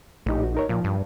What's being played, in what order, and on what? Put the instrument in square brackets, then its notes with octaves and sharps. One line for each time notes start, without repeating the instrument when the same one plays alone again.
[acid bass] A#1 [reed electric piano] A2 D#4 G4
[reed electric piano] F#4
D#4 A#4 C#5
[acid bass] A#2 [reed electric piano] F3
[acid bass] G2